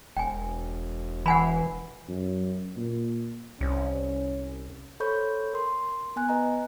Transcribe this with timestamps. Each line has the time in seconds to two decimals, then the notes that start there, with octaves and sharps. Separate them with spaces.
0.17 E1 G5 G#5
1.26 E3 F#5 G#5 B5
2.08 F#2
2.77 A#2
3.61 C2 C#4
5.00 A4 C5 C#5 B5 C#6 G6
5.53 A#4 C6
6.16 B3 G#5 F#6
6.29 B4 D#5 A#5